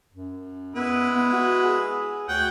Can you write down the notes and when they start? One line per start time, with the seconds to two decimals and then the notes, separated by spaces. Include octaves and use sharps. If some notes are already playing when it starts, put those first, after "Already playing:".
0.14 F#2
0.75 G#3 B3 E4 B4
1.15 B3
1.33 F#4
1.64 G#4
2.28 D2 C#5 F#5 G5